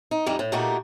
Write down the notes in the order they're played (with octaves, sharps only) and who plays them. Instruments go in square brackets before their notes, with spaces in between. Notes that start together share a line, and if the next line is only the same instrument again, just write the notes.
[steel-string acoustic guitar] D#4
F2 E3 G3 D#4
A2
A#2 A3 A#3 D#4 F#4 G4